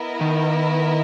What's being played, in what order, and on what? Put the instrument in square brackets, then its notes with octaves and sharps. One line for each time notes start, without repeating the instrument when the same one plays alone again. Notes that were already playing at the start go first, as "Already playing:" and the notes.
Already playing: [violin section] B3 E4 A#4 D#5
[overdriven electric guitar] D#3